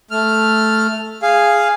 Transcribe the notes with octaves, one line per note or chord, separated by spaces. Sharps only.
A3 F6
G#4 F5